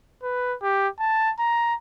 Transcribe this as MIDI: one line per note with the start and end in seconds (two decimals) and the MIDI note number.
0.23 0.55 71
0.62 0.89 67
1.00 1.32 81
1.39 1.75 82